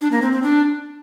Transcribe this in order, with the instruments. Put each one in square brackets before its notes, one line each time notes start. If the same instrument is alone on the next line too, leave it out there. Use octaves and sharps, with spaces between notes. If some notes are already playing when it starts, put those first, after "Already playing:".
[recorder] D4
A#3
C4
C4
D4